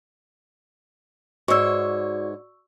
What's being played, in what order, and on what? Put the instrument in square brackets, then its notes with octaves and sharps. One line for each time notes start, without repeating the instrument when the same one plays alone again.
[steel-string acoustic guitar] G#2 C#5 [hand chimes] F#4 D5 [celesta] C#6 E6